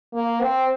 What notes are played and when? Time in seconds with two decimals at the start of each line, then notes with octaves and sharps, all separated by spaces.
0.14 A#3
0.41 C4